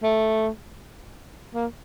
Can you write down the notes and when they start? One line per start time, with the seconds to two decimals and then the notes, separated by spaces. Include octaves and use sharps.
0.03 A3
1.55 A#3